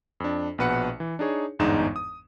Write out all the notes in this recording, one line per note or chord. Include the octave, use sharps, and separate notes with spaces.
F2 D4
A#1 B2 B4 F#5 C#7
E3
D4 D#4 G#4 C#5
G1 E2 G#2 D4 D#4 E7
D#6